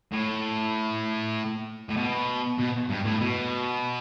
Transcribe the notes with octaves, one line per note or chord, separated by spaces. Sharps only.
A2
A2
B2
B2
G2
A2
B2